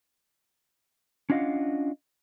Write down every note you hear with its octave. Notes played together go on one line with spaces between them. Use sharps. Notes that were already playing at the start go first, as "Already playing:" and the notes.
C#4 D4 F4 D#5 F5 F#5